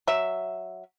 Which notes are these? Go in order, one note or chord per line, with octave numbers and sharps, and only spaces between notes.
F#3 E5